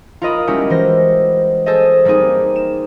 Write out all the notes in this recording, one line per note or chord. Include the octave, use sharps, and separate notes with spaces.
F4 A#4 D#5 B5
G3 G#3 C#4 E4 F#4 G4
E3 C5 A#6
G#4 A4 C5 D#5
G3 A#3 C4 D#4 G#4
E7